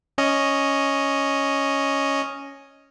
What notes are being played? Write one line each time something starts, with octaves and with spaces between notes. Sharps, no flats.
C#4 D#5